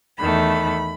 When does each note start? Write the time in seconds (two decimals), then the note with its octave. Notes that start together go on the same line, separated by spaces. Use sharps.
0.18 E2 D#3 A3 B5